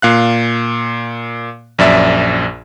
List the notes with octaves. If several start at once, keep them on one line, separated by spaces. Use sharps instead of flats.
A#2 F5 F#6
A#1 F#2 D5 E5